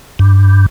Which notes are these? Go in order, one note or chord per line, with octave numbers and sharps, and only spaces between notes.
G2